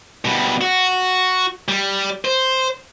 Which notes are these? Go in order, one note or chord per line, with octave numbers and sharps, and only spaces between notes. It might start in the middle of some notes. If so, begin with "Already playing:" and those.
B2 G3
F#4
G3
C5